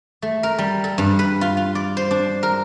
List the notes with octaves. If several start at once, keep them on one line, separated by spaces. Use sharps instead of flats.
A3
A#4
G3
A4
G2
B4
F4
F4
D5
C5
D4
A#4